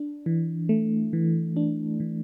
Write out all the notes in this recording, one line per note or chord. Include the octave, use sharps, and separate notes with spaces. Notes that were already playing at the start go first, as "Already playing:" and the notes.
Already playing: D4
E3
A3
E3
D4
E3